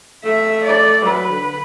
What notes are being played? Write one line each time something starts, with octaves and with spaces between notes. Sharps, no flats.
A3 E5
D5
F#3 B4
D3